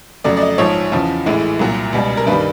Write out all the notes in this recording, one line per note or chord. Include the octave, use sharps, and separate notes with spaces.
F2 C#3 F#3 A3 D5
D5
D#5
A#1 G#2 F3 C#5
E2 C#3 F3
A#1 A2 E3 G#3
C2 A#2 F#3 A#3
C#2 B2 G3
A#4
G2 D#3 G3 B4